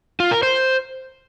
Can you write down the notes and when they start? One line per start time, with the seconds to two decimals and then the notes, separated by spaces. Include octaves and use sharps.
0.20 F4
0.31 A#4
0.43 C5